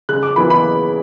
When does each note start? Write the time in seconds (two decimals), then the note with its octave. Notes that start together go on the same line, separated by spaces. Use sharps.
0.09 C#3 F#6
0.23 D6
0.36 E3 B3 E4 B5
0.50 B5